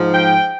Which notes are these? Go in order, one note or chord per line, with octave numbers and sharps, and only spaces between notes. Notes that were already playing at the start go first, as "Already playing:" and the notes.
Already playing: G#2 F3
G5